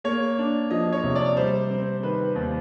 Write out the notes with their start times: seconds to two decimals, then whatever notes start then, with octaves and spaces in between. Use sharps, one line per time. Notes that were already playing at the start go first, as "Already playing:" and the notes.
0.04 A#3 C#5
0.38 D4
0.71 F3 D#5
0.93 C#5
1.04 C3
1.15 D5
1.37 G3 C5
1.70 C4
2.03 D#3 B4
2.36 D#2